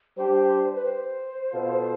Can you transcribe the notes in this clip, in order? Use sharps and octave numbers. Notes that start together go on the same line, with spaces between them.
G3 D4 G4 C5
B4
C5
B2 B3 F4 A4